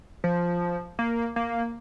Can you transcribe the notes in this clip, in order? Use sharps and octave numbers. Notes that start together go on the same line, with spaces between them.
F3
A#3
A#3